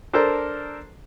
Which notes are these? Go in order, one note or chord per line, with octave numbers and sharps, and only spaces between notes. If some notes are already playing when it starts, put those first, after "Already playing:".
D4 A4 A#4 C5 A#5